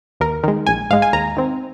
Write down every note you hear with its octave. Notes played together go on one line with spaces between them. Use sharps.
D#2 A#4
D#3 G#3
A#1 G#5
G#2 G#3 F5
G#5
D#2 A#5
D#3 C4